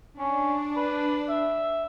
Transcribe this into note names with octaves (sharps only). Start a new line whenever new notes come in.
C#4 D4
B4
E5